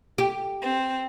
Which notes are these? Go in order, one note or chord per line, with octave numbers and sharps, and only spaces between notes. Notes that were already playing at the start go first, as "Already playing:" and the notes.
G4
C4